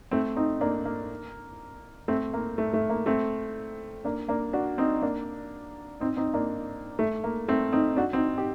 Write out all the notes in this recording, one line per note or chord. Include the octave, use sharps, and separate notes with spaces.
A3 C4
C4 D#4
A#3 D4
A#3
A3 C4
A#3
A3
A3
A#3
A3 C4
A#3 D4
A#3 D4
D4 F#4
C4 D#4
A#3 D4
C4 D#4
C4 D#4
A#3 D4
A3
A#3
A3 C4
C4 D#4
D4 F#4
C4 D#4
G4